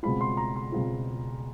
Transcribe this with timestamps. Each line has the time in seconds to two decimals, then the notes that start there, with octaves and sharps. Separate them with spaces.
0.03 C#2 B2 G#3 C4 F4 B5
0.21 C6
0.37 A#5
0.56 C6
0.72 C#2 B2 G#3 C4 F4